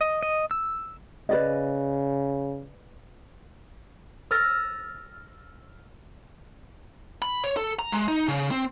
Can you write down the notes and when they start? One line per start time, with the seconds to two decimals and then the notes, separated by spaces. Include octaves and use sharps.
0.01 D#5
0.23 D#5
0.51 E6
1.29 C#3 B4 D5 D#5
4.31 E6 F6 A6 A#6 D#7
7.22 B5
7.44 C#5
7.57 A4
7.79 A#5
7.92 G#3
8.08 D#4
8.28 C#3
8.51 C4